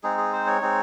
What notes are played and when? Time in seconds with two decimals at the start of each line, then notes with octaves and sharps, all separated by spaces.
0.03 G#3 C4 D#4 G#4
0.18 G#4
0.33 C5
0.47 C#5
0.61 G#3 C4 D#4